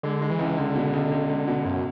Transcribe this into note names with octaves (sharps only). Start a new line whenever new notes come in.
D3 G#3
G#3
E3
C#2
C#2 D3
B2
C#2
C#2
C#2
B2
C#2 F#2